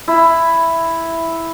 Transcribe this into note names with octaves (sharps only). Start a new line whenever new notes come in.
E4